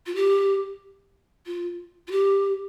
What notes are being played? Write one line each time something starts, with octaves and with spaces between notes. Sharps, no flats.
F4
G4
F4
F4
G4